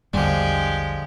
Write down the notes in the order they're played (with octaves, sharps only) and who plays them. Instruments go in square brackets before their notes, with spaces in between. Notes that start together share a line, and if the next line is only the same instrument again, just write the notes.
[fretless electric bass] A#1 E2 G3 [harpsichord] D3 F3 [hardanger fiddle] G#3 G4